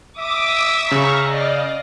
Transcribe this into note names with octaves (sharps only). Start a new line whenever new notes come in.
E5 D6 D#6
C#3 F5 A#5 C#6
D5 D#5 F5